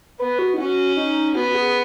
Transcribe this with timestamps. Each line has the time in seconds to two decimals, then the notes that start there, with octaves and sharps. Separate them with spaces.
0.19 B3 B4
0.39 F#4
0.54 D#4
0.58 C#4 F#4
0.97 D#4
1.35 B3 F#4
1.54 G#4